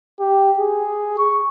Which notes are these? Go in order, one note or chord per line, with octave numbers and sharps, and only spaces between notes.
G4
G#4
C#6